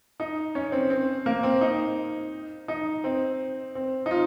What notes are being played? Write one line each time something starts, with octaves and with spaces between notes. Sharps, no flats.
D#4
C#4
C4
C4
A#3
C4
D#4
D#4
C4
C4
D#4
F4